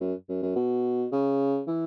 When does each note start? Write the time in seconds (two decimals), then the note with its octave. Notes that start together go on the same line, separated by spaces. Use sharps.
0.01 F#2
0.29 F#2
0.43 F#2
0.56 B2
1.12 C#3
1.68 E3